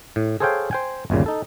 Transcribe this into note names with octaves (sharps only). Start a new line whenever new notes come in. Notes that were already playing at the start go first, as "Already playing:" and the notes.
A2
G#4 A4 C5 C#5 F5 G5
C5 G5 G#5
G1 D#2 A#2 C#3
D#4 A4